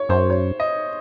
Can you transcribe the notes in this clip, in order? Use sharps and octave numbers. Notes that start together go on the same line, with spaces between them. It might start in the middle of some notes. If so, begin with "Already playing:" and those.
Already playing: C#5
F#2 C5
C#5
D#5